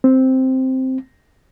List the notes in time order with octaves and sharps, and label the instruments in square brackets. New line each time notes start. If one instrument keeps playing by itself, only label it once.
[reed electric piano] C4